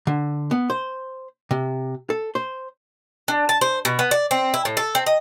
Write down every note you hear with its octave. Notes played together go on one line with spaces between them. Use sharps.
D3
B3
C5
C3
A4
C5
D4
A5
C5
B2
B3
D5
C4
E4
A2
A4
C4
D#5